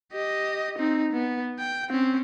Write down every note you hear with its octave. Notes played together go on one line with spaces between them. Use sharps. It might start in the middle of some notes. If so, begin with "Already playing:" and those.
G4 D#5
C4 D#4
B3
G5
C4 C#4